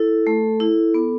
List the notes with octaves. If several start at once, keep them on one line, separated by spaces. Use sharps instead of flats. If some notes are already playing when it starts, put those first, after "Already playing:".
Already playing: E4 A4
A3
E4
B3